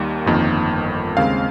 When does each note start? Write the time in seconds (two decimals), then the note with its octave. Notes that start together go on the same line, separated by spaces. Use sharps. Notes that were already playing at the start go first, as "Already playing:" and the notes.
Already playing: D#2 D#3 G3 A#3
0.26 G1 F2 D#3 A#3
1.17 D#2 C#3 G#3 C4 F5